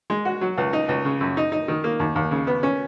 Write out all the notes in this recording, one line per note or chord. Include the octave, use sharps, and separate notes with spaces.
G#3
F#4
F#3
C#2
D#4
C#2
C#3
F#2
D#4
D#4
D#3
A#3
D#2
D#2
C#3
B3
C#4